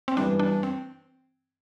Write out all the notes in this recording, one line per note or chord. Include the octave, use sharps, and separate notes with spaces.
C4
G2 E3 B3 D4
D4
C4